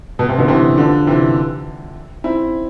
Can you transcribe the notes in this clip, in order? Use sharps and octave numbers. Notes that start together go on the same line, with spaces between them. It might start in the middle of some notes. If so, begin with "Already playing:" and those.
B2
C3
B2 D3
C3 E3
D3 F3
C3 E3
C4 E4